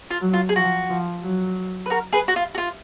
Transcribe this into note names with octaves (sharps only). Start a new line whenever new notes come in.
F4
F#3
F4
G#4
F3 F#4
F3
F#3
B4
F#4 A#4
G#4 B4
F#4
F4
F#4
F4